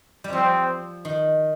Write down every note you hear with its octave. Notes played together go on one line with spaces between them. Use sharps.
G3
F3 C4
D#3